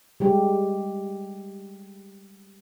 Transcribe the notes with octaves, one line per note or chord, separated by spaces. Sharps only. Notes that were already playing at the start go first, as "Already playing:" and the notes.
G3 G#3 G4